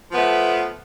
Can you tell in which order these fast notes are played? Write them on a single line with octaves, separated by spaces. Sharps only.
F3 B3 A3